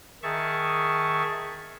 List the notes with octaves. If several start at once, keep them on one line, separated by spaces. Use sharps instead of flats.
D#3 G#4 E5 A5 C#6